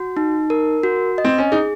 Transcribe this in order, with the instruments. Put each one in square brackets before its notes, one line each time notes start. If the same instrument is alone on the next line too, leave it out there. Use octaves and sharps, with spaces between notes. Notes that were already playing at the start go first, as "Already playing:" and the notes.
Already playing: [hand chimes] F#4
D#4
A#4
F#4
D#5
[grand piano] C4
C#4
[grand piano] D#4 [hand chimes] G#4